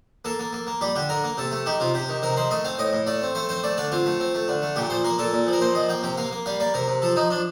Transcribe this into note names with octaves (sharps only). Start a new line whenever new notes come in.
A#3 A4
A#3
A#3
A#3
G3 G4
D3 G4
D3 A#4
A#3
C3 A4
A3
D#3 G4
C3 F4
C3 G4
D#3
C3 A#4
D#3 C5
A3 D#5
C4 F5
A2 D#5
A2
A3 D5
C4
A3 C5
C4 C5
A3 D5
D3 D5
C4 F4
A3
C4
A3
D3
A3
A#2 G4
F3 C5
A#3 A#4
A#2 A4
A#2
F3
A#4
A#2 C5
F3 D#5
A#3 G5
C3 G5
A#3 F5
A#3
G3 F5
A#3 D5
C3 A#4
C3
F3 A4
F3 D#4
F3 D4